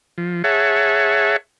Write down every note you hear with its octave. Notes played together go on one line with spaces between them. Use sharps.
F3
G#4 C#5 E5 F#5 A5